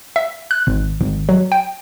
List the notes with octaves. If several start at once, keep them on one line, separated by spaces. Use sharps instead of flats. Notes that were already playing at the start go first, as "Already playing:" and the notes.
E5
F#6
G#1
G#1
F#3
G5